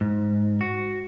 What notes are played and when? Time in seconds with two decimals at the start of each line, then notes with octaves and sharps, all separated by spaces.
0.01 G#2
0.61 F#4